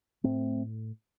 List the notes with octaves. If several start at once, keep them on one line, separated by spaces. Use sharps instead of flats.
A2 A3 C4